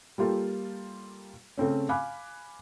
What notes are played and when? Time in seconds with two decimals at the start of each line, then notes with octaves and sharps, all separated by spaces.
0.18 G3 A#3 F4 G4 A4
1.58 C#3 A3 C4 C#4
1.89 F5 G#5 B5 D6 F#6